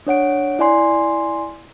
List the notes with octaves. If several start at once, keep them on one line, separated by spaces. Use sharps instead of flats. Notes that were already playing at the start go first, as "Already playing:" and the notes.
D4 C#5 F#5 D7
E4 D5 G#5 C6